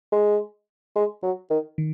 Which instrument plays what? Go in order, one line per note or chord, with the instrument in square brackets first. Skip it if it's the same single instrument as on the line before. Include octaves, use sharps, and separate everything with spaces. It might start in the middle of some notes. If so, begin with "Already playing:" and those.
[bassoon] G#3
G#3
F#3
D#3
[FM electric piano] D#3